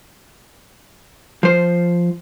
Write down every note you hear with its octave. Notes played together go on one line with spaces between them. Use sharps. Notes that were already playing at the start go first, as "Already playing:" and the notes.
F3 C5